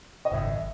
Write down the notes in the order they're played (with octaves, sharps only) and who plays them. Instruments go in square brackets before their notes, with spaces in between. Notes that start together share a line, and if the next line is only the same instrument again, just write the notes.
[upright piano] D#5
[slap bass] G#1 F#2 C#3 [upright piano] E5